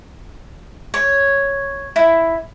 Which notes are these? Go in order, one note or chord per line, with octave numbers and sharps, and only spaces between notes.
C#5
E4